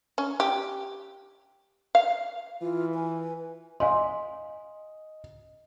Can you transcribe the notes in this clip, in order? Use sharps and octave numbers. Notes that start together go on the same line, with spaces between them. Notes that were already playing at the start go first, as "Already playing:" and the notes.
C#4
G4
F5
E3 F4
B4 G#5
D#5 F5 G#5 C6